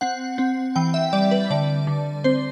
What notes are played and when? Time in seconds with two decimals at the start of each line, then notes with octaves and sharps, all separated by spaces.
0.01 C4 F#5
0.38 C4
0.76 E3 G5
0.94 E5
1.13 G3 D5
1.31 B4
1.50 D3 D5
1.87 D3
2.24 C4 C5